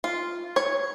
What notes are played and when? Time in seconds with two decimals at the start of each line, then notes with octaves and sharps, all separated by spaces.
0.04 F4
0.56 C#5